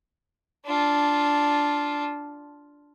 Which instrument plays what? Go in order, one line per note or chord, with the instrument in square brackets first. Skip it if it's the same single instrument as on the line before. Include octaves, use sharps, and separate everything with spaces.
[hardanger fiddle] D4 F4